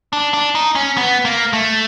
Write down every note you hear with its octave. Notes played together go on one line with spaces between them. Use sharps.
D4
D4
D#4
C#4
B3
A#3
A3